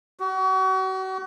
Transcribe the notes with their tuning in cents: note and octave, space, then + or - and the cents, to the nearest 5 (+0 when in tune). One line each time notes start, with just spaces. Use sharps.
F#4 +35